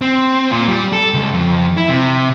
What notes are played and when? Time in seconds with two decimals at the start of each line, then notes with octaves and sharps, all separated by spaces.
0.01 C4
0.50 A#2
0.68 G3
0.93 A4
1.14 C#2
1.34 F2
1.77 E4
1.89 C3